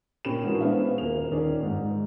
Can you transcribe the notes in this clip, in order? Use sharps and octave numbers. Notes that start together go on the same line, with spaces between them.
A#2 C#4 G4 B5 E7
A#2 E3 G#3 A#3 D4 F#4
B3 C#4 G#4 C5 E5 F5
D#1 A#3 F7
D#1 D#3 C#4 G#4 D5
G#2